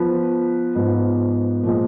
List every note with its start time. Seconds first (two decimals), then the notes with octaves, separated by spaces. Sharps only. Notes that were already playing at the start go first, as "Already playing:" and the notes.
Already playing: F3 B3 F4 B4
0.75 G#2 F3 B3 F4
1.63 A#2 F3 G#3